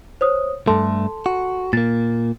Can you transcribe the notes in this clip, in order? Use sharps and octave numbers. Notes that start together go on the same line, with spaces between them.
C5 C#5 D#6
G2 A3 A4 A5 C6
F#4
A#2 A#3 A6